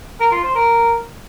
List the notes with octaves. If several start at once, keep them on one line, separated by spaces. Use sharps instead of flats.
A#4
F4
C5
A#4